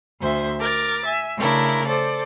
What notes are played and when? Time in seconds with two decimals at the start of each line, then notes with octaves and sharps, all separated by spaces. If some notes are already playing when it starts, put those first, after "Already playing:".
0.20 D2 C5 E5
0.59 A#4 D6 A6
1.05 E5 G#5
1.37 C#3 A3 D4 E4 A#4
1.86 A4 C5 D5